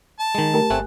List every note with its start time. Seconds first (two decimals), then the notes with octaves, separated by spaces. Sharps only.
0.20 A5
0.35 D#3 G#3
0.54 A3 G4 A#4
0.70 G1 A3 C4 G#5 F#6